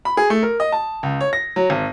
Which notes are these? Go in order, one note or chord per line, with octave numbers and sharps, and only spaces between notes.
B5
G#4
A3
A#4
D#5
A5
C#2
C#5
A#6
F#3
G#1